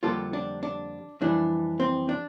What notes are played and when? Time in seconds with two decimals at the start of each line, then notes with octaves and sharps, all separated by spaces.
0.03 F2 D3 G3 A#3 F4 A4
0.33 D4
0.63 D4
1.21 F2 E3 G3 D4
1.80 C4
2.09 D4